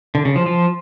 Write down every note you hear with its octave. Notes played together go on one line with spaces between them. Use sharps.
D3
C#3
F3
F3